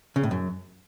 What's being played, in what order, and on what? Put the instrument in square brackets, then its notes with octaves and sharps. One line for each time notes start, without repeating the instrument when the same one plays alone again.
[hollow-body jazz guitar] C#3
A2
F#2